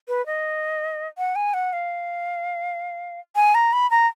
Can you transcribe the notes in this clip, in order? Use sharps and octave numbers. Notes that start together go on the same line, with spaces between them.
B4
D#5
F#5
G#5
F#5
F5
G#5
A#5
B5
A#5